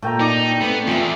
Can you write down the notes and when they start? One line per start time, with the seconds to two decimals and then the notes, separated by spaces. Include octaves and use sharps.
0.02 A#2 A3 G5 A#5
0.21 D#4 D5
0.61 A3 B3 C4
0.87 E2 F4 E5